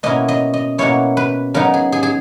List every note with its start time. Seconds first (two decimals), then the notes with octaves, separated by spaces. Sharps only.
0.03 B2 A#3 C#4 E4 D#5
0.28 D#5
0.54 D#5
0.78 B2 A#3 C#4 E4 C#5
1.17 B4
1.54 C#3 F#3 B3 D#4 A#4
1.74 G#4
1.92 G#4
2.03 G#4